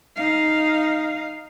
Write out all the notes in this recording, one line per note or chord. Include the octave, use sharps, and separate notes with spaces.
D#4 F5